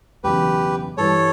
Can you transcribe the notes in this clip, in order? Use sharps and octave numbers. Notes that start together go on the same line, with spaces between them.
E1 E2 C#3 F#3 G4 B4
G2 E3 G3 A4 C#5